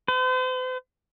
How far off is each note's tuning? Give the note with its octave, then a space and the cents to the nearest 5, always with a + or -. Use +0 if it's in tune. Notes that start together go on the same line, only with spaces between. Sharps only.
C5 -45